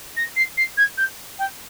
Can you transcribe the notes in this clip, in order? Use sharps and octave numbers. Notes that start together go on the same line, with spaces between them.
A#6
C7
C7
G#6
G6
G5